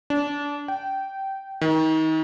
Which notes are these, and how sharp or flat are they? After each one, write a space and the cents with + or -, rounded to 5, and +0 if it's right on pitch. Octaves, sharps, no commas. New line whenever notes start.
D4 -25
G5 -20
D#3 +30